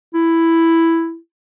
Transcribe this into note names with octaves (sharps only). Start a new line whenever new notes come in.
E4